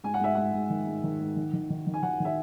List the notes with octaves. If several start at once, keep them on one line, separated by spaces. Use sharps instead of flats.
G#2 G#5
F#5
G#2 E5
G#2 F#5
G#2
D#3
G#2
D#3
G#2
D#3
D#3
D#3
D#3
G#5
D#3 F#5
D#3 E5